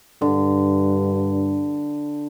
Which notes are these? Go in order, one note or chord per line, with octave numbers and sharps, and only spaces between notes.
G2 D3